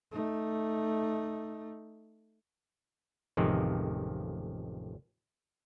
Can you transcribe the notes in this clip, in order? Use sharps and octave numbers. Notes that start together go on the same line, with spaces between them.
A3 D#4
A1 F2 C3 D#3 F3 G#3